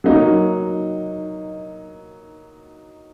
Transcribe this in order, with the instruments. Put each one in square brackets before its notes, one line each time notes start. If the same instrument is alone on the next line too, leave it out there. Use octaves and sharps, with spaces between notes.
[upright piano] F#3 A#3 D#4